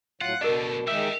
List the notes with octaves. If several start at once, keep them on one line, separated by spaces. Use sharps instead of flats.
A2 F#3 F4 F#5
B2 F#3 A3 D4 A#4 D#5
D#3 G#3 D#4 G4 E5